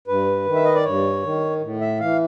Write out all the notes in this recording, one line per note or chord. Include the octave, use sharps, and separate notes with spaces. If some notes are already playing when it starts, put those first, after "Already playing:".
G2 B4
D#3
E5
D#5
D5
G2 C#5
D#3
A2
E5
E3 F5